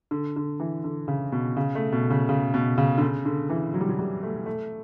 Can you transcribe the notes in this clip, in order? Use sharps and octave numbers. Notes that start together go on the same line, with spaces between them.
D3
D3
E3
D3
C#3
B2
C#3
A3
B2
C#3
C#3
B2
C#3
D3
C#3
D3
E3
F#3
G3
F#3
G3
A3
A3